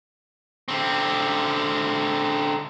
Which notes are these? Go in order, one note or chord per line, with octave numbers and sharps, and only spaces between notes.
D3 C4